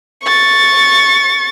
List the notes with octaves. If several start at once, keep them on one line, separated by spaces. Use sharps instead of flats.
C#6 A6